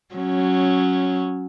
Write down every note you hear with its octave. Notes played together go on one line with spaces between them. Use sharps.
F#3 C#4